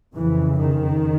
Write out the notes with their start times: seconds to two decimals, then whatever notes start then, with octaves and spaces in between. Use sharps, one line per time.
0.14 F2 C#3 E3
0.59 D#3